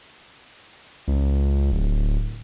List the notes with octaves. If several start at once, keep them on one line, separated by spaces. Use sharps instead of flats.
C#2
D1